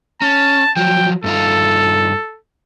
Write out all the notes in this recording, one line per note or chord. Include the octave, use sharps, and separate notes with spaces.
C#4 A5
F3 F#3 G5
G2 D#4 F4 A4